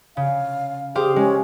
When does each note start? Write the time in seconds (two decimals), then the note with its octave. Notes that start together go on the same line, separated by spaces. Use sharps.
0.17 C#3 F5
0.95 G4 G#4 C5 F5
1.16 G#3 C#4